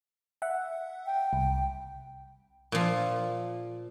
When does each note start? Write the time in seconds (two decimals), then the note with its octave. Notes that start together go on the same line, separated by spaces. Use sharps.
0.42 E5 F#5
1.06 G5
1.33 C2
2.72 A#2 F3